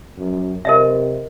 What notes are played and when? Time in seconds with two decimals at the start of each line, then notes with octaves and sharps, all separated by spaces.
0.17 F#2
0.65 C3 A#4 D#5 E5